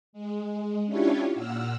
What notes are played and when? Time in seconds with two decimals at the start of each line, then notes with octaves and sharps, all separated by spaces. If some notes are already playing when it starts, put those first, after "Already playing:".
0.13 G#3
0.86 C#4 D4 E4 F4 G4 C#5
1.33 A#2 F#5 E6 F6